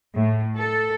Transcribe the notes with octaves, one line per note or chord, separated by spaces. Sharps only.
A2
A4